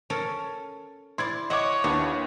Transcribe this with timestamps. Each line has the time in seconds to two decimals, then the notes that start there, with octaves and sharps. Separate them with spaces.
0.10 C#4 A4 A#4
1.18 E4 D5 C6 G#6
1.50 C#5 D#5 E5 F#5 D6
1.84 D#2 B3 D4 E4